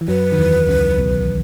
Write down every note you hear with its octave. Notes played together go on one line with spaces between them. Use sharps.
E3
F#2 F#3 B4
D#3
E2 E3
C#2 C#3
B1 B2